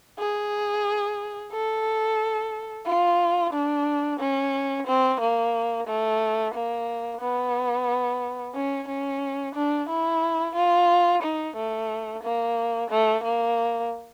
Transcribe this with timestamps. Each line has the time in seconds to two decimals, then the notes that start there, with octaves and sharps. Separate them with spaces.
0.19 G#4
1.52 A4
2.86 F4
3.53 D4
4.19 C#4
4.87 C4
5.20 A#3
5.87 A3
6.54 A#3
7.21 B3
8.55 C#4
8.88 C#4
9.55 D4
9.89 E4
10.55 F4
11.22 D#4
11.56 A3
12.23 A#3
12.90 A3
13.23 A#3